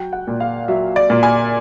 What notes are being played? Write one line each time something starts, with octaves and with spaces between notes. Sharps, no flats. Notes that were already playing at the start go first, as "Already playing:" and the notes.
Already playing: F#3 G5
F#5
A#2
F5
F#3 E5
D5
A#2
G#5